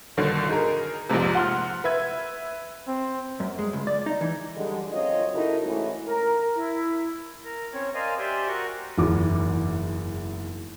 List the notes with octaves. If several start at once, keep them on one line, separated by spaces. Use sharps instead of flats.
G1 B2 D3 D#3
D#4 G#4 A#4
A#1 F2 G#2 C3
F#5 C6 F6
B4 E5 G#6
C4
F#2
G#3
C#2
D5
D#4
E3
F#2 D3 G3 G#3
F#2 C4 F4 C#5 D#5
C#3 D#4 E4 F#4 A4 A#4
G#2 E3 A3 C#4 E4
A#4
E4
A#4
C4 C#4 C#5
A#4 C5 D5 D#5 F5 G#5
G4 C5 D5 E5 G5 G#5
F#4 A#4 F#5 C#6
F#1 E2 G#2 D6